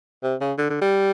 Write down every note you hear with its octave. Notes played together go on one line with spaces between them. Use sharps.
C3
C#3
D3
D3
G3